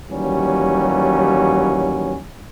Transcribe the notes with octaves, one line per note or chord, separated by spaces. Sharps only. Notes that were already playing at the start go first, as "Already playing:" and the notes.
D#2 E3 F#3 G3 C#4